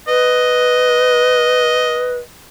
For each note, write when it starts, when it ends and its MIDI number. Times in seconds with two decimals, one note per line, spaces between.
0.08 2.16 71
0.08 2.24 75